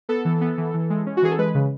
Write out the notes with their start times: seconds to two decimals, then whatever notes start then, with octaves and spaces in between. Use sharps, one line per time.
0.09 B3 A4
0.25 E3
0.41 B3
0.58 E3
0.74 E3
0.90 G#3
1.06 C#4
1.17 F#4
1.22 E3 G#4
1.32 A4
1.38 G#3 B4
1.55 C#3